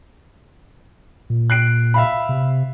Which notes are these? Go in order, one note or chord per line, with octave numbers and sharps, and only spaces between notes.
A#2
F#6 C7 D7
E5 F5 B5
C3